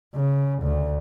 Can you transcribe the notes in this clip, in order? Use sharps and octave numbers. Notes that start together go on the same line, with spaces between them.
C#3
D2